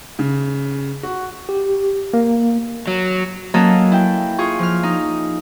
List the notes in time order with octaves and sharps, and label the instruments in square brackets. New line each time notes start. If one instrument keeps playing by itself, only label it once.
[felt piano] C#3
F#4
[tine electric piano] G4
A#3
[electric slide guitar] F#3
[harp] F#3 A#3 C#4 A4 A#4 D#5
E4 G5
F4 G#4 C#6
F3 F6
D#4